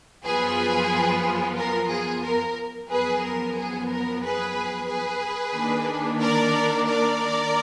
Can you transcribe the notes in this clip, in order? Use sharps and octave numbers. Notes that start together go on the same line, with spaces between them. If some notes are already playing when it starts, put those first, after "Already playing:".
F#2 F3 B3 F4 G#4 B4
A#4
G#4
A#4
F#2 F3 B3 G#4 B4
A#4
G#4
A#4
G#4 B4
G#4 B4
D#3 A#3 D4
A#4 D5
A#4 D5